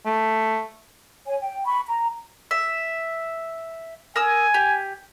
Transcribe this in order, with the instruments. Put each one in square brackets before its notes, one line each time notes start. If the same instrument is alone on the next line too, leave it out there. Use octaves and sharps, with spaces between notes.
[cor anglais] A3
[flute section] C#5 G#5
G5
B5 C#6
A#5
[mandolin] E5
[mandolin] A#4 D#6 E6 [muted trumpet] G#5
[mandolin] G4